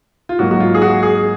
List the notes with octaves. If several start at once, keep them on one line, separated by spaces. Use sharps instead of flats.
F4
G#2 F#3 A#3 F#4
F#4
F4
G#4
F#4
G#4